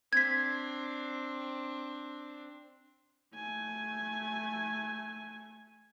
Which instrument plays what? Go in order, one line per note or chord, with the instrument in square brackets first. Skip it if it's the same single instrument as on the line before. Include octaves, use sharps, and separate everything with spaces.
[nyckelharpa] C4 D4 [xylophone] G#6 B6
[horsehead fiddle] A3 G#5